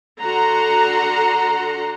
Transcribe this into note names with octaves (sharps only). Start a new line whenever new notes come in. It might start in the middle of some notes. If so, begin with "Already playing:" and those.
D3 F#4 F#5 A#5 C6